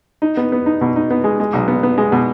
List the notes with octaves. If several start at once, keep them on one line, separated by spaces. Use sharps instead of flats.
D#4
B3
B3
D#4
B2
D#4
B3
G#3
G#3
B1
B3
B3
G#3
B2